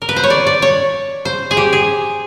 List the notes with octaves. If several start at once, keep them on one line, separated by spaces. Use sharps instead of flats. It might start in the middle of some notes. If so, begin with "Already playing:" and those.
A#4
B4
C5
C#5
D5
D5
C#5
C5
G#4
G4
G#4